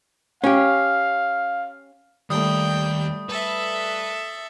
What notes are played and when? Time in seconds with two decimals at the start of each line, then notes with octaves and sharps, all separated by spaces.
0.44 C#4 G4 F5
2.30 D#2 G3 A3 G5 D#6
3.29 A4 B4 E5